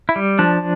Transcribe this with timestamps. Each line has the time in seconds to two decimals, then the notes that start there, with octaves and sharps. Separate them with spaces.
0.09 E4
0.16 G3
0.39 F3 D4